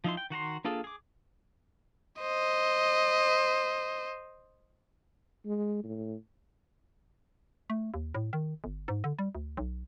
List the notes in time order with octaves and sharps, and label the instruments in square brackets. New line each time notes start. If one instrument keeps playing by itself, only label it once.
[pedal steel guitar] F3 D#4 E4 C6
G5
D#3 F#4 A#5 C6
A#3 D4 F4 G#4 A4
G#4 D6
[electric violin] C5 D#5
[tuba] G#3
A2
[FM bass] A3
D#2
A2
D#3
G1
G#2
D3
G3
D2
B1